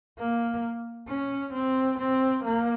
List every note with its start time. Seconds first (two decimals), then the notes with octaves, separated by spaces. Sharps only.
0.19 A#3
1.08 C#4
1.53 C4
1.98 C4
2.44 A#3